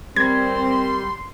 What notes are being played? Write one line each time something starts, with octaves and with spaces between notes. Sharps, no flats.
G3 C4 A#4 C6 G#6